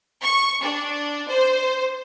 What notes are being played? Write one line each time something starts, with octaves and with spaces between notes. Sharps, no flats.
C#6
D4
C5